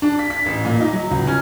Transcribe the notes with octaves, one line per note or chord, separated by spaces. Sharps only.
D4
B6
B6
A1
A#2
D#4
F#3
C#2
C#4